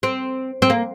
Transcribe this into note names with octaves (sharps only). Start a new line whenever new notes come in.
C4
C4
A#3